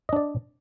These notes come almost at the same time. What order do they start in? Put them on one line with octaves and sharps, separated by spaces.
D#5 D4 D5